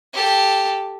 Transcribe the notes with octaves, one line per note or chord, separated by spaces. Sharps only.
G4 A4